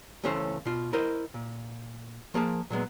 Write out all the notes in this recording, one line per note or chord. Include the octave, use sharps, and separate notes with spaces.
C#2 E3 A3 C#4 C5 F5
B2 F4
E4 A#4 C5 D#5
A#2
F3 A#3 G#4 A5
A#2 F#3 G#3 B3